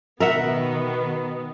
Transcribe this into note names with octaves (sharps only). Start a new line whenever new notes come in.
B2 D#3 B3 A#4 E5 F#5